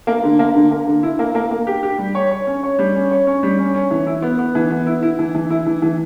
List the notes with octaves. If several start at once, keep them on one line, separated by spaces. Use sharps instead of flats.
A#3
D3
A#3
D3
A#3
D3
E4
A#3
A#3
A#3
G4
G4
G3
C#5
C#5
C#4
C#5
G3
C#4
C#5
C#4
G3
C#4
C#4
E3
E4
B3
B3
E3
B3
E4
E4
E3
E3
E4
E3
E3